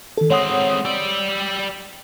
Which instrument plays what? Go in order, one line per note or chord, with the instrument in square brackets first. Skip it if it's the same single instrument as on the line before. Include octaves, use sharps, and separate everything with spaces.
[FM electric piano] D#3 A4
[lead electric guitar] G#3 C4 [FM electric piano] C#5 F#5 D#6
[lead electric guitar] G3 D5 [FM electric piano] E6